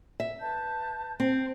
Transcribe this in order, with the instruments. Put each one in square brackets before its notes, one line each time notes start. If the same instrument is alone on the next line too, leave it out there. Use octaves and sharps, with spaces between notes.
[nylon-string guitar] E5
[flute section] B4 A5 G6
[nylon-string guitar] C4